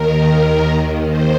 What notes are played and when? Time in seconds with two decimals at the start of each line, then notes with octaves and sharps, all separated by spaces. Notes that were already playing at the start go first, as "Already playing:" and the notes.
Already playing: D#2 D#3 A#4
1.08 C5